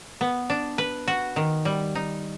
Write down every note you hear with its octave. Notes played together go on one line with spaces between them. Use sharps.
B3
D4
B4
F#4
D#3
G3
D#4